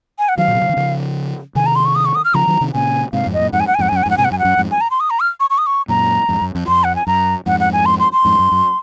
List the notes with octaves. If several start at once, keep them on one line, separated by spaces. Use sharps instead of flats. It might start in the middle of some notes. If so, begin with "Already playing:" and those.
G#5
F#5
D#3 F#3 F5
A#2
C3
C#3
D#3
C#3 F3
C3 D#3 G#5
A#5
C6
C#6
D#6
C#6
D#6
F6
C#3 F3 A#5
D#3 F#3
C3 D#3
A#2 C#3 G#5
G#2 C3 F5
F2 G#2
D#5
F#2 A#2
F2 G#2 F#5
G#5
F#5
G#5
F2 G#2 F#5
G#5
F#2 F#5
F2 G#2 G#5
F#5
G#2 C3 G#5
F#5
F#2 G#5
F#5
F#2
F2 G#2
G#5
A#5
C6
D#6
A#5
F6
C#6
C#6
D#6
C#6
F#2 A#2 A#5
F2 G#2
F#2
F2
F2 C6
F#5
G#5
F#2 A#5
F2 G#2 F#5
F#5
G#5
C6
C6
C6
F2 G#2
F#2
F#2